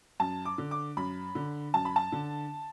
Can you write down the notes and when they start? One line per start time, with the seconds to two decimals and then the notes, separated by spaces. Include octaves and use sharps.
0.20 F#2 A5
0.45 D6
0.58 D3
0.71 D6
0.97 F#2 B5
1.35 D3
1.74 F#2 A5
1.85 B5
1.96 A5
2.12 D3